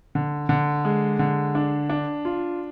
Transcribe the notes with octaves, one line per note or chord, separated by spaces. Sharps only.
D3
D3
G#3
D3
D4
D4
F4